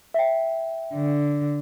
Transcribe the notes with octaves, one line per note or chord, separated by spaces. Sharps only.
E5 G5
D3